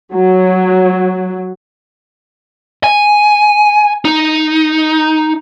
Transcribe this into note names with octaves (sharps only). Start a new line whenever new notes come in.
F#3
G#5
D#4